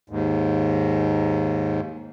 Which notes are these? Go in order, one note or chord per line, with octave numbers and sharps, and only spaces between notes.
D#2 G#2